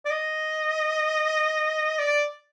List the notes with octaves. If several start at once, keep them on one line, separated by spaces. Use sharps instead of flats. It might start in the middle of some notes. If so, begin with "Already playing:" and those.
D5
D#5
D5